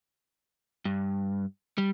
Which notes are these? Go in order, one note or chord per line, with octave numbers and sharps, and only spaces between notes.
G2
G3